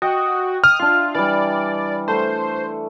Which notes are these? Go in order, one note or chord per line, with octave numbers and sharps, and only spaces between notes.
F#4 D#5 G5
D#6 F6
D4 F4 E5
E3 G3 D5
A3 C5